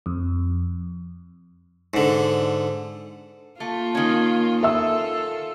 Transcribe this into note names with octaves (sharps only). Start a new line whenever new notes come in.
F2
G#2 D3
A3 A#3 F4
D#3 C#4
F4 A4 E5 E6